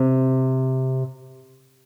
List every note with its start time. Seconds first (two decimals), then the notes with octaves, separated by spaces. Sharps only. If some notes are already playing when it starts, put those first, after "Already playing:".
Already playing: C3